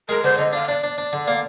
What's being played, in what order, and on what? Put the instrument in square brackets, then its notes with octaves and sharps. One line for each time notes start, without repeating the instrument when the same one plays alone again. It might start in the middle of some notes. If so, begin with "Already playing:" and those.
[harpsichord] G#3 [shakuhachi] A#4
[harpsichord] D3 [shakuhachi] C5
[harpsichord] D3 [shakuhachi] D#5
[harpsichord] D4 [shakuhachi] F5
[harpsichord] D4 [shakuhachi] D5
[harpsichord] D4
D4
D3
A#3